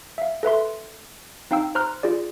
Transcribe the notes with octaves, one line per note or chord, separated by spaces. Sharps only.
E5 F5
A4 B4 E5 C6
C4 D#4 F5 G5 E6
C5 A#5 C6 F6 F#6
F4 G#4 D5